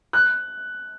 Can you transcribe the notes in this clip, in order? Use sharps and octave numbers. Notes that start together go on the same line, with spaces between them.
F#6